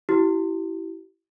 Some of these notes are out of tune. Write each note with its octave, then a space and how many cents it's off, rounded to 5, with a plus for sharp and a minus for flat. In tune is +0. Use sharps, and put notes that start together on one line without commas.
E4 +0 G4 -35